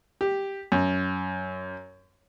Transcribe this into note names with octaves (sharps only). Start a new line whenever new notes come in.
G4
F#2